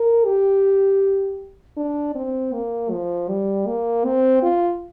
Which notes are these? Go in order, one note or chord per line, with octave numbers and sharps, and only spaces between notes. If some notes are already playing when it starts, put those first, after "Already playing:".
Already playing: A#4
G4
D4
C4
A#3
F3
G3
A#3
C4
F4